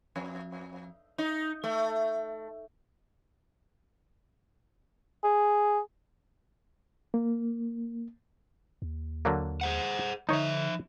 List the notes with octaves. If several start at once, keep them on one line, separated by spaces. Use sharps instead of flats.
F2
D#4
A3
G#4
A#3
D#2
D3 F#3 A#3
G#4 C5 F#5
D3 F3 D#4 C#5 E5